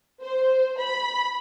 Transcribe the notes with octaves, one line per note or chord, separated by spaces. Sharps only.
C5
B5